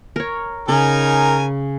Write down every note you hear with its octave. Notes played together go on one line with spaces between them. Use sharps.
A#4 C#5
C#3 D#4 A#4 G#5